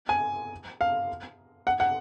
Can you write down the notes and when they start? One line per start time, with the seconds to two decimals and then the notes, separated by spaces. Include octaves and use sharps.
0.09 G#5
0.81 F5
1.67 F#5
1.80 F#5